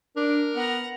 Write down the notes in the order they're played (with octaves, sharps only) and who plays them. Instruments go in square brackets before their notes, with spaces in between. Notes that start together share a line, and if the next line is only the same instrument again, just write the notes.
[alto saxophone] D4 [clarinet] A#4
[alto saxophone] B3 [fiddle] F#5 A#5